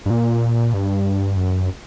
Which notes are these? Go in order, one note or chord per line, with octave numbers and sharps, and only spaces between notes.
G2
A#2
G2
F#2